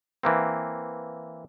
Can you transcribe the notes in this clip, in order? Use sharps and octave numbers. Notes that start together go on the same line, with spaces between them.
E3 A#3 C4